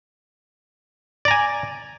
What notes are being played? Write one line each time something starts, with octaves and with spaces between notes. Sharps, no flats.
D5 G#5 A#5